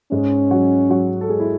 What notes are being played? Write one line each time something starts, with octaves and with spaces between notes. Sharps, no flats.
G#2 G#3 C#4
F#3 F#4
F#3 F#4
A4
G#3 G#4
E4